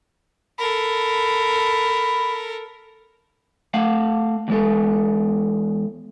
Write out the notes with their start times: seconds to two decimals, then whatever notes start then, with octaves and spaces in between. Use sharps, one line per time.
0.59 A4 A#4 B5
3.74 A3 F5 F#5
4.48 E2 G#3 A4